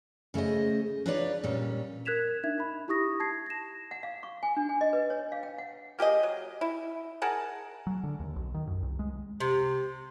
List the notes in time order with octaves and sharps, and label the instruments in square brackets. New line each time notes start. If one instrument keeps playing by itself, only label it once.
[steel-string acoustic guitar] C#3 A3 G#4 C5 D#5
D4 D#4 F4 B4 C#5 D5
A#2 G3 C#4
[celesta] A#4 F#6 G#6 B6 E7 F7
D4 D#4 E5 G#6
D#4 B5
E4 G4 C#6 D#6 A#6
A5 G#6 C7
A#6 E7
[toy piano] F#5
F5
C#6
G#5
D4
G#5
D#5
B4
C#5
F5
G5
F#5
[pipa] A#3 G4 G#4 D#5
F#3
E4
G#4 A#4 F#5 A5
[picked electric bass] F#3
D3
D#2
B1
D#3
F#2
C2
G#3
[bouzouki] C3